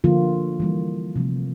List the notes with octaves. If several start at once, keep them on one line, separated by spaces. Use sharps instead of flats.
D3 F3 A#3 F4
E3 G3 A#3
C3 F3 A3